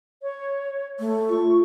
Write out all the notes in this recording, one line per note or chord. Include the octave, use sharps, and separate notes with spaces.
C#5
A3
F4 C#6